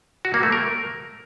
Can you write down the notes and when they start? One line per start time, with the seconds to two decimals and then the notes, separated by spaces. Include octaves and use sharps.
0.25 F#4
0.34 A#3
0.43 A3
0.52 A#4